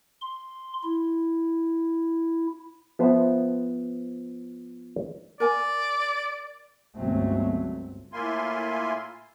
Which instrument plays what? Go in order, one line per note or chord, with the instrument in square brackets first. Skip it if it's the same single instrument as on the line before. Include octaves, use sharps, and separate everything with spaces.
[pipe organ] C6
E4
[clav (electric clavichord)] F3 B3 C5 E5
[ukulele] A#4 G#5 [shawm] D5
[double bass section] G1 C#2 F#3 A3 C4
[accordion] A2 A#3 E4 F4 G#5 C6